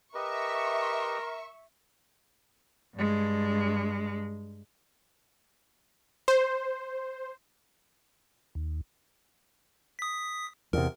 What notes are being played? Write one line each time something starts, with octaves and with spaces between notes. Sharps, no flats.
G4 A#4 B4 D#5 E5 C#6
G2 G#3
C5
D#2
D#6 B6
E2 C3 A#4